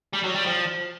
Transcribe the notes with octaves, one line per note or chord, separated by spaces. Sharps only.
G3
F#3
G3
F3